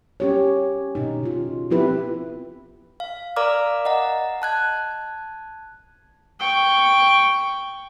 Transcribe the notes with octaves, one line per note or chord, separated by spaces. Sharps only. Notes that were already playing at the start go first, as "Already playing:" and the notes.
C#4 G4 C#5
B2 D#4
C#3 F4
F3 B3 C4 E4 G4 B4
F5
A#4 D5 F5 A#5 D6 F6
D#5 F#5 A#5
A5 F#6 G#6
G5 C#6